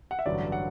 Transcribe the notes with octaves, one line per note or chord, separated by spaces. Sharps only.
F#5
E5
A1 G2 D3 F#3 D5
F#5